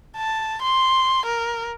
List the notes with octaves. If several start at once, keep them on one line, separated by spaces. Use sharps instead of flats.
A5
C6
A#4